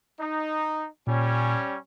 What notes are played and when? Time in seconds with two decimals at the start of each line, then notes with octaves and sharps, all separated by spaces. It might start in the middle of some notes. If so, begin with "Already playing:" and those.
0.19 D#4
1.07 A#2 G3 C#4